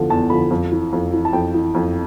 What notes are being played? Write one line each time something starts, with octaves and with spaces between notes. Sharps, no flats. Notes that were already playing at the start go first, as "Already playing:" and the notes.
Already playing: E2 D3 F3
E2 A5
D3 F3 B5
F2
E3
F2
E3
A5
F2 G5
E3
F2